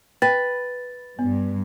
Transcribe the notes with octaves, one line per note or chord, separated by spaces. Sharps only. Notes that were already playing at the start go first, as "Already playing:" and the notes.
B4 G5 A6
G2 B3